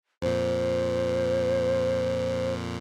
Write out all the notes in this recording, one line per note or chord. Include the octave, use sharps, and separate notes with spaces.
F2 A#2 C5